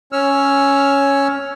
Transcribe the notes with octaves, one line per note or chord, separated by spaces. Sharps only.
C#4 C#5 E6 F6